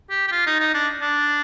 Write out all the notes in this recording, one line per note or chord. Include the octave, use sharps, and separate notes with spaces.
G4
G4
F4
D#4
D#4
D4
D4